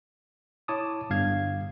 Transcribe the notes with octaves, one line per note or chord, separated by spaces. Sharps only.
E4 C#5 A5 D6 D#6
G1 G2 F5 G#6